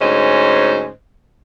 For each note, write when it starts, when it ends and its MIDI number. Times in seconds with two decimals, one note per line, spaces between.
0.01 0.91 38
0.01 0.91 44
0.01 0.91 61
0.01 0.91 72
0.01 0.91 75